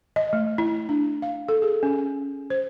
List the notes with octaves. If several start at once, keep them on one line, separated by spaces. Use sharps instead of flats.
D#5
A3
E4
D4
F5
A4
G#4
C#4
C5